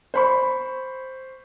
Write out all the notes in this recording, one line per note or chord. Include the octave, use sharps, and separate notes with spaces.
C5 B5 C#6